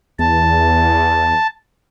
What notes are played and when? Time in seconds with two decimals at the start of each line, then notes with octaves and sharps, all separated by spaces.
0.19 E2 A5